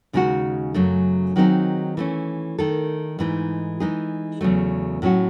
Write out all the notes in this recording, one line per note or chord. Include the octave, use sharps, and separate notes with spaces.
D#2 C#3 G#3 D#4 F#4
F#2 C#3 F#3 A3
D#3 F#3 C4 D#4 G#4
E3 A3 C#4
D#3 A3 D#4 A4
G#2 E3 A3 D#4
E3 G#3 D#4 G#4
E2 C#3 F#3 A3
A2 F#3 C#4 F#4